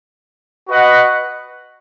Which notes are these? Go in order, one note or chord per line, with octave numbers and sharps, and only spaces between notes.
F#4 B4 D#5 F#5